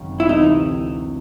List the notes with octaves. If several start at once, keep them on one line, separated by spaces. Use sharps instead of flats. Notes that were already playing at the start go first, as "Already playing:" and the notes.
Already playing: G#1 F#2 C#3 F#3
E4
D2 C3 E3 D#4